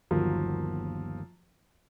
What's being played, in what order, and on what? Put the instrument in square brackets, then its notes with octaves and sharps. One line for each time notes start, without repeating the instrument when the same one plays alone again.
[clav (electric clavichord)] G1 D#2 A#3 [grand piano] F3 F#3 F4